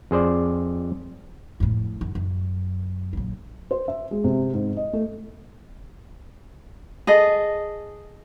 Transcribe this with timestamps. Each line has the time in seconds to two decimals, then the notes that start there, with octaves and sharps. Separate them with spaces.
0.11 F2 G#4 C5 D5
1.60 F2 A2
2.01 F#2
2.15 F#2
3.13 A#1 F#3
3.71 C5
3.88 E5
4.11 G#3
4.24 C3
4.54 G#2
4.77 D#5
4.93 A3
7.07 G#4 A4 D#5